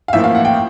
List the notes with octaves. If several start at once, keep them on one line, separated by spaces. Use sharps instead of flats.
F5
A1 A2 F3 A#3 E5
F5
F#5
G5